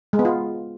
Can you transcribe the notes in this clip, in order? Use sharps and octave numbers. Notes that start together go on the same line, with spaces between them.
G#3
B3
F4